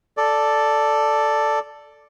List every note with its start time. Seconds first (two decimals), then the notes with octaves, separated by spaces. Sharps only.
0.17 A4 D5